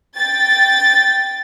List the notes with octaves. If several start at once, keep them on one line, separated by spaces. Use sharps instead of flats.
G5 A6